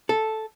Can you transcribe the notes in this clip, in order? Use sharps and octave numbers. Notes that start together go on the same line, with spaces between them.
A4